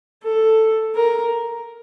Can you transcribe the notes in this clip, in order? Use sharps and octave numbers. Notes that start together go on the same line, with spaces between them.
A4
A#4